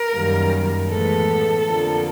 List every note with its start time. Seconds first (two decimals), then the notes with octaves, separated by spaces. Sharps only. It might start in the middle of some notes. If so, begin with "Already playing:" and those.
Already playing: A#4
0.13 F#2 D#3 G3 A#3
0.89 A2 E3 G#3 B3 A4
1.66 F2 D3 F3 A#3